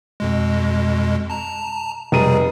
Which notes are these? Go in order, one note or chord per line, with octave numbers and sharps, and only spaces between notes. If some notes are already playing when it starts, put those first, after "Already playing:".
F2 B2 G#3
A5 A#5
F1 B2 G3 G#4 A#5 D#7